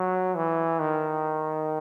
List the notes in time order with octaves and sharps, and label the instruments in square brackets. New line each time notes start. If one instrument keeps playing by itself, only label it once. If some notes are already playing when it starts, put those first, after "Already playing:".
Already playing: [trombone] F#3
E3
D#3